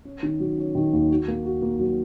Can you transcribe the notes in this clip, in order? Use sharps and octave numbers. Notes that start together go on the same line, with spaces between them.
C#4
D#3
F#3
C#4
D#3
D#2
F#4
A#3
F#4
A#3
F#3